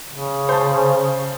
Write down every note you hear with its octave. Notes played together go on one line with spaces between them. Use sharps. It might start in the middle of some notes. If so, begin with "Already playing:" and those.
C#3
C5 A5